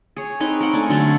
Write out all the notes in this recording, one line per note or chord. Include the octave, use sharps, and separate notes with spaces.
G#4 C#5
C4 D#4 B4 C#5
A#4 F#5
A3 D4 G#5
D3 F#3 A3